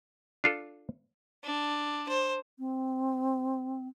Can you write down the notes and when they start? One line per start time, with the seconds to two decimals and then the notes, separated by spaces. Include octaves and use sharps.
0.44 D4 F4 A4
1.44 D4
2.09 C5
2.59 C4